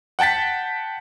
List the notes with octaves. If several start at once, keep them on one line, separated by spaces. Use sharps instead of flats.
F#5 G5 A5 A6 B6